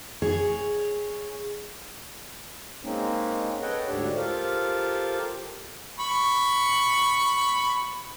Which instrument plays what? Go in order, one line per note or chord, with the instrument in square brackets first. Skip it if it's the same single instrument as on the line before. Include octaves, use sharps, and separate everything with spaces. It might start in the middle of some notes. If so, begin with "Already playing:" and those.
[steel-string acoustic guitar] G#4 C#5
[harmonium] G#3 A#3 C4 C#4 D#4
A4 B4 C#5 D#5 F#5 G5
D2 G#2 D4 G4 A4 C#5
F4 G4 A4 A#4 C5 F5
[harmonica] B5 C#6